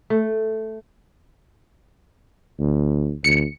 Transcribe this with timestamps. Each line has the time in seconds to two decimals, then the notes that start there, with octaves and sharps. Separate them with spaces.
0.10 A3
2.59 D2
3.24 D2 C#7